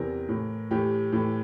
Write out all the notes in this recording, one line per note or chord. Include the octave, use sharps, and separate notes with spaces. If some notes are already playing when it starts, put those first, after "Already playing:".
Already playing: E2 C3 E3 A#4
A2 E3
A2 E3 G4
A2 E3